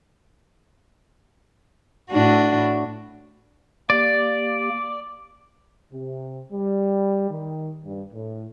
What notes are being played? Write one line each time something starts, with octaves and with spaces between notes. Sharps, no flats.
A2 D4 F#4
A#3 G4 D5
C3
G3
D#3
G2
A2